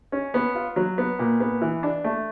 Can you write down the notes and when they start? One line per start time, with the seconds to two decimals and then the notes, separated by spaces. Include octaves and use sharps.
0.12 C#4
0.34 B3
0.55 F4
0.76 F#3
0.98 B3
1.19 A#2
1.40 B3
1.61 E3
1.83 D4
2.04 A3